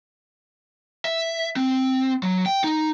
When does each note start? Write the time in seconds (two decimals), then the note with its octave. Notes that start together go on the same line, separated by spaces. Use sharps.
1.05 E5
1.56 C4
2.23 F#3
2.46 G5
2.64 D#4